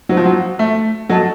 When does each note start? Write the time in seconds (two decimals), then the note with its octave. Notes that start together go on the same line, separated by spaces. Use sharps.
0.09 F#3 D#4 F#4 C5
0.17 F3
0.26 F#3
0.59 A3
1.09 F#3 A4 D#5 A5